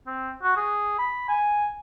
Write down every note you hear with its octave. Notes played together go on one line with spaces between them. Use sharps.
C4
F#4
G#4
B5
G#5